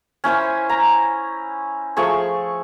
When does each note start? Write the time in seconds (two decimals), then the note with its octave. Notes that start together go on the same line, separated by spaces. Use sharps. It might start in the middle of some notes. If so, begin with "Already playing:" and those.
0.24 C#4 E4 C5 G#5
0.69 A#5
1.97 F3 A3 G#4 C#6